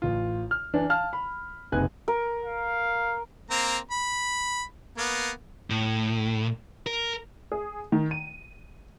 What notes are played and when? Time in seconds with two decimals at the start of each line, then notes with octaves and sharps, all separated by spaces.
0.02 A1 F4
0.51 F6
0.73 E3 D4
0.89 F5 A5 F6
1.13 B5
1.72 F#1 C3 D#4 B4 G#5 F#6
2.08 A#4
2.45 F5
3.50 A#3 C4 A#5
3.91 B5
4.98 A#3 B3
5.70 A2
6.86 A#4
7.52 G#4
7.92 D#3
8.11 D#7